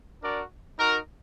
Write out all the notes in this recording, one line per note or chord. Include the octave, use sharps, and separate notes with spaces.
D4 F#4 A#4 D5
D#4 F#4 A#4